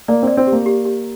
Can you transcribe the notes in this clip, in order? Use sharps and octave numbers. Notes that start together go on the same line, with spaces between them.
A#3 D5
C4 D5
C4
G4
A#3
G4
G4